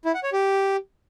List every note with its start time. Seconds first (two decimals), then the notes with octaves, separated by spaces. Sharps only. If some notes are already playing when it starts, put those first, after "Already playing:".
0.05 E4
0.14 F#5
0.23 C#5
0.32 G4